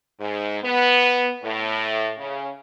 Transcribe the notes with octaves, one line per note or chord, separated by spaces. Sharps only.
G#2
B3
A2
C#3